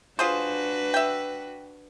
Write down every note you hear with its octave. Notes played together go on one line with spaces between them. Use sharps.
D4 F4 F#4 G#4 B4 C5
E5 G5